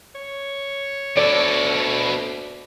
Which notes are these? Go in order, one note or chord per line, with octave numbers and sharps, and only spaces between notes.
C#5
D2 B2 A4 D5